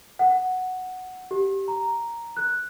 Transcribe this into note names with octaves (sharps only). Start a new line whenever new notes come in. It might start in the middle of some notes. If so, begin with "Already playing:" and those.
F#5
G4
A#5
F#6